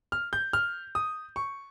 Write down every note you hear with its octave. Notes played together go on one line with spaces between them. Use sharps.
F6
G6
F6
D#6
C#6